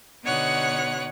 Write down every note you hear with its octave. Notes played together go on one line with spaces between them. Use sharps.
B2 D3 D#4 C#5 F#5 F#6